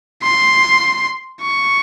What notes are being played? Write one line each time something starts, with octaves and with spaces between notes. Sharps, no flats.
C6
C#6